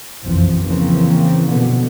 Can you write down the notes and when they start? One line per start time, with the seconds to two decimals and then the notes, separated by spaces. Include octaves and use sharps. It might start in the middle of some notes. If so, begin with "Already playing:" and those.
0.23 F#1 B1 F2 E3 F3 C4
0.64 C#3 E3 F3 A#3 C4 C#4
1.50 B2 D3 B3